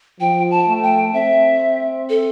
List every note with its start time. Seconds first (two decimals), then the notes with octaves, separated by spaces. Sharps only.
0.20 F3 G5
0.51 A5
0.68 A3
0.83 G5
1.14 C4 E5
2.09 A4